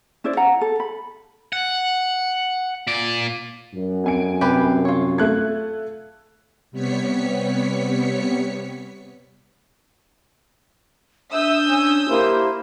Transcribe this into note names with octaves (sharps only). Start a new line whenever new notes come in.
C#4 E4 C5 D5
F5 F#5 A#5
A4
B5
F#5
A#2 D5
F#2
F2 G#5 D7
C2 G4 B4 G#5
F4 C#5
A3 F#6 G#6
C3 G3 B3 C#5 B6 C#7
D4 E5 D#6 E6 G6
C#4
A#3 E4 G4 C5